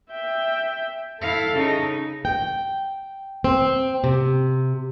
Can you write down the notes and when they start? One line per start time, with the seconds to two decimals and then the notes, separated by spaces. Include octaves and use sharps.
0.11 E5 G5
1.21 E4 A4 F5
1.53 C#3 D#4
2.25 G5
3.44 C4
4.04 C3